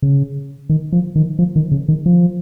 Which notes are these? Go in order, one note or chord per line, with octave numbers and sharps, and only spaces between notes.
C#3
D#3
F3
D#3
F3
D#3
C#3
D#3
F3